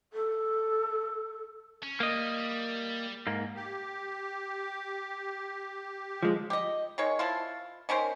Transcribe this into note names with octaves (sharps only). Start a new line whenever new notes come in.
A4
C#4
G3 A#3 D#5
G#2 A#3
G4
F3 G#3
G4 D#5
D#3 G#3 C#5
F3 E4 F4
D#3 C#4 A#4 C5